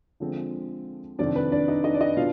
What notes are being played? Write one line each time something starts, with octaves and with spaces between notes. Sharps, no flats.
D3 F3 G#3 C4
F2 C3 D#3 D4 D5
B4
D4 D5
D#4 D#5
D#4 D#5
D5
D#4 D#5
B2 D4 F4 F5